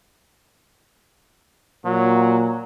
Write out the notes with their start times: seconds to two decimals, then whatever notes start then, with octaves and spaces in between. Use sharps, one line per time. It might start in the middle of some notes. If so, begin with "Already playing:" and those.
1.85 A#2 F#3